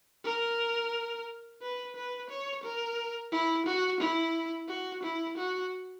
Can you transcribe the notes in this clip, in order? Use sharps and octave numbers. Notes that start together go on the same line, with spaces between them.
A#4
B4
B4
C#5
A#4
E4
F#4
E4
F#4
E4
F#4